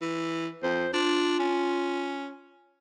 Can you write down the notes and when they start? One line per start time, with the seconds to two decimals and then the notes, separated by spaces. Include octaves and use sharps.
0.01 E3
0.63 F2 C5
0.93 D4 F4
1.39 C#4